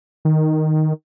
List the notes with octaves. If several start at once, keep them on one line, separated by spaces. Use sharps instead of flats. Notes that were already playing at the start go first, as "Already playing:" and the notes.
D#3